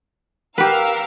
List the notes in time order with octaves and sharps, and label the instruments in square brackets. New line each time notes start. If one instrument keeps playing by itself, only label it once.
[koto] G4 B4 [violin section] A#4 F5 E6